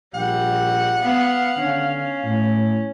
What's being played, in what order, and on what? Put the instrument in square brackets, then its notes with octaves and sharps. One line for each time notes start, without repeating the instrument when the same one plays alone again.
[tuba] A#1 [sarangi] G3 [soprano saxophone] F#5
[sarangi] B3 [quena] F5
[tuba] D3 [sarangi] C#4
[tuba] A2